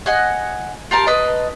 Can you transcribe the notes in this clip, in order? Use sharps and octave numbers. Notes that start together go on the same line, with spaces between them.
D#5 F#5 G#5 F#6
F4 G4 A#4 A5
B4 D#5 A5